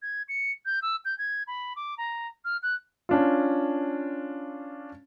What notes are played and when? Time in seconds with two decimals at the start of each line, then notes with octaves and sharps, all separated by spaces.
0.02 G#6
0.29 C#7
0.66 G6
0.82 E6
1.05 G6
1.18 G#6
1.47 B5
1.76 D6
1.98 A#5
2.45 F6
2.63 F#6
3.09 C#4 D4 F4